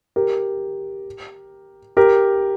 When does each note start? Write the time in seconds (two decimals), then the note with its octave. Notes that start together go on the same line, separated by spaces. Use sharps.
0.16 G4 A#4
1.97 G4 A#4